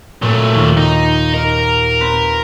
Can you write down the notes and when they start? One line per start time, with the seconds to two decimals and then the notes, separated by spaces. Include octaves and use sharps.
0.22 A#2 F#3 A3
0.55 D#2 F4
0.77 D#4
1.34 A#4
2.01 C4 B4